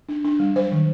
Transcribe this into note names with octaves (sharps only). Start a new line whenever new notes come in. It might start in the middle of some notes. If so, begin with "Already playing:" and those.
D4
D4
G3
F#3 C5
D#3